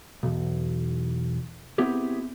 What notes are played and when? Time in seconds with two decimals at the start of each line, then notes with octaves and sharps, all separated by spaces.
0.23 B1 E2
1.78 B3 C4 E4 G4 G#4